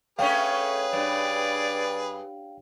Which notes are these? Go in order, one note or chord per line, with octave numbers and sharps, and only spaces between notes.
A3 C#4 G#4 B4 C#5 F5 G5
G2 D5